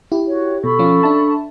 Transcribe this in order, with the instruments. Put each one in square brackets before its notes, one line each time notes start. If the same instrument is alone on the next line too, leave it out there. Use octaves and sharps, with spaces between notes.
[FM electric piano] E4 G4
[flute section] F#4 C#5
[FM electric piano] B2 [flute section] A4 B5 C#6
[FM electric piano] F3 C#4 F5
D4 E5 A5